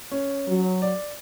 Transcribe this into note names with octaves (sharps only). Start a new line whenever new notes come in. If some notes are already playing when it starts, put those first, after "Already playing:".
C#4
F#3
D5